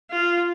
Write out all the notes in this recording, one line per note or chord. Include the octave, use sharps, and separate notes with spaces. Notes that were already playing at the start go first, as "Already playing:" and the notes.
F4